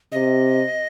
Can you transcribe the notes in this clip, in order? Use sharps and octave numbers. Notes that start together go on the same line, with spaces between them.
C3 D#5